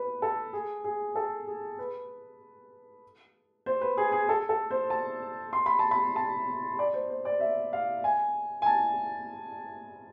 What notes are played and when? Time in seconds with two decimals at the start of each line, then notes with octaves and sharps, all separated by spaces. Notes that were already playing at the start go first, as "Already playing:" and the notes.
Already playing: B4
0.22 A4
0.53 G#4
0.84 G#4
1.15 A4
1.47 G#4
1.79 B4
3.66 C5
3.81 B4
3.97 G#4
4.12 G#4
4.29 A4
4.49 A4
4.71 C5
4.90 A5
5.53 C6
5.66 B5
5.79 A5
5.91 B5
6.16 A5
6.79 D5
6.94 C5
7.10 C5
7.25 D5
7.41 E5
7.73 F5
8.04 G#5
8.62 G#5
8.66 A5